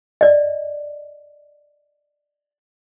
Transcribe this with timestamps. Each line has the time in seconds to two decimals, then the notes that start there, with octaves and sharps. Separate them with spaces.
0.21 D5 D#5